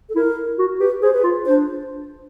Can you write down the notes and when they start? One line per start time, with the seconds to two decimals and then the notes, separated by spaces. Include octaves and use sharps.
0.09 A4
0.16 E4 A#4
0.59 F#4
0.80 G4 B4
1.02 G#4 C5
1.13 B4
1.24 F4
1.45 D4 C5